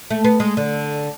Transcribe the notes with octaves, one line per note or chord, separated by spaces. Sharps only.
A3
B3
G#3
D3